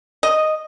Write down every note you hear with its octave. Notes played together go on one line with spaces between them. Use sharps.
D#5